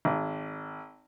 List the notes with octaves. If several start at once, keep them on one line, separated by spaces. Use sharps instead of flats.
G#1